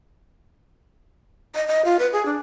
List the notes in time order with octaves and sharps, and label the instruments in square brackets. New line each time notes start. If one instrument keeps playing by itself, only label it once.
[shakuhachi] D#5
D#5
F4
B4
G#4
D4